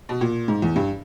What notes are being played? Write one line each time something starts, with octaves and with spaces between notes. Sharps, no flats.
B2
A#2
G#2
E2
G2